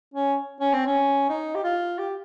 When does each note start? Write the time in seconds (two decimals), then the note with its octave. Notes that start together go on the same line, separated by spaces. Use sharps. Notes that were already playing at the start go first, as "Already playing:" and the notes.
0.14 C#4
0.60 C#4
0.73 C4
0.86 C#4
1.29 D#4
1.55 G4
1.64 F4
1.99 G4